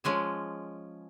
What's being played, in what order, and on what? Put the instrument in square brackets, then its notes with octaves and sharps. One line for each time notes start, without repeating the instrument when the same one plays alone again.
[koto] F3 G#3 C#4 G#4